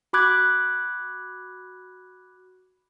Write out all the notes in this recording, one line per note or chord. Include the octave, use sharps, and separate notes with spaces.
F#4 B5 D6 F#6 G#6